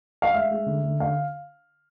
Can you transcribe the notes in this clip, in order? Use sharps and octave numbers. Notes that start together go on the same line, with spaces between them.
F5
G#3 E5
G#3
D3
D3
D3 F5